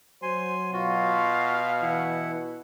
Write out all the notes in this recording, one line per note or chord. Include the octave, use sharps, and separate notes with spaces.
F#3 C5 G#5 C6
B2 F4 F#4 F5
E3 E4 F#5